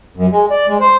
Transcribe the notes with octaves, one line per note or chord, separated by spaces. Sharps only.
F#2
G#3
D5
G#3
C5